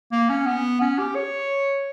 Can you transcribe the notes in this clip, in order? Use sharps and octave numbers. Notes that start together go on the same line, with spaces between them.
A#3
C#4
B3
C#4
G4
C#5